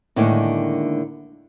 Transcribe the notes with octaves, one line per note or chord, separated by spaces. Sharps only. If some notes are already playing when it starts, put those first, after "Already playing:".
A2 D3 D#3 G#3 A#3 A4